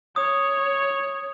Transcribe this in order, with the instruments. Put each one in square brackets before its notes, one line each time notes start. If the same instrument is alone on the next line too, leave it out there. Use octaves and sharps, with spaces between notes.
[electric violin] C#5 [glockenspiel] D#6